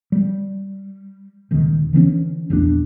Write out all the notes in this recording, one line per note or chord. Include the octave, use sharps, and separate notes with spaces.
G3
D#1 C#2 D#3
D3 E3 G#3 C#4
A#1 E2 D#3 D4